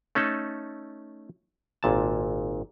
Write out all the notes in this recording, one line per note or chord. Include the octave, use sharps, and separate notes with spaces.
A3 C#4 D#4 A4
G#1 A#2 A5